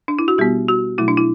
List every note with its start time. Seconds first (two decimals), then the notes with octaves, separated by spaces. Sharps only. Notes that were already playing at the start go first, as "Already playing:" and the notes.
0.08 D4
0.19 E4
0.28 F#4
0.38 B2 G3 B3 G4
0.68 F#4
0.98 B2 F#3 A3 E4
1.08 D4
1.17 E4